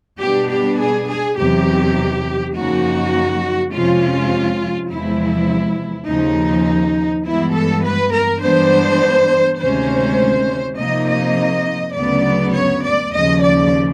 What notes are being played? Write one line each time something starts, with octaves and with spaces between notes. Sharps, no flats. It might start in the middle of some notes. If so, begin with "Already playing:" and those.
B2 G3 B3 D4 G4
G4
G#4
G#4
E2 C3 D#3 F#3 G4
F#2 C#3 F3 A#3 D#4 F#4
F2 C3 F3 G#3 C#4 F4
E2 C3 F3 G#3 E4
D#2 C#3 F3 D#4
G2 E3 G#3 B3 E4
A4
B4
A#4
G2 E3 G#3 B3 D4 C5
D2 C3 D#3 G#3 C#4 C5
C3 F3 A#3 D#4 D#5
D#5
D2 C#3 F#3 B3 D5
C#5
D5
D#2 C#3 F3 D#5
D5